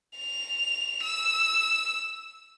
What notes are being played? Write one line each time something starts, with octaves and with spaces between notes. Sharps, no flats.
F7
E6